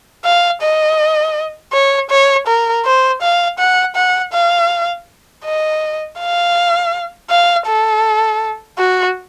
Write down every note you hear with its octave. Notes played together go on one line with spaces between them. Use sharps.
F5
D#5
C#5
C#5
A#4
C5
F5
F#5
F#5
F5
D#5
F5
F5
A4
F#4